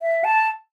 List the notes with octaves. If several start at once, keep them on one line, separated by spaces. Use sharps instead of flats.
E5
A5